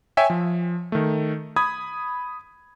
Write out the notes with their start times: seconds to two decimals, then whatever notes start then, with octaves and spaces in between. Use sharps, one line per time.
0.17 C#5 E5 G5 G#5
0.30 F3
0.92 D#3 A3
1.56 B5 D#6 G#6